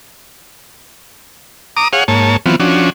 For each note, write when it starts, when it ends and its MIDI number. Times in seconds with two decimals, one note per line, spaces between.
1.77 1.88 82
1.77 1.88 86
1.77 1.88 87
1.93 2.04 68
1.93 2.04 73
1.93 2.04 77
1.93 2.04 78
2.08 2.37 44
2.08 2.37 58
2.08 2.37 73
2.08 2.37 81
2.46 2.56 52
2.46 2.56 54
2.46 2.56 59
2.46 2.56 60
2.46 2.56 65
2.60 2.90 53
2.60 2.90 61
2.60 2.90 62
2.60 2.90 66